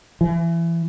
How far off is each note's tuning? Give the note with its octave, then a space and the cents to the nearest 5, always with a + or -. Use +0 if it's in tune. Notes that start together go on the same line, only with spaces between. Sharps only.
E3 +25